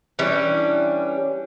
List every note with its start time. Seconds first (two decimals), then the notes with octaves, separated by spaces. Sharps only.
0.19 E3 G3 C#4 D4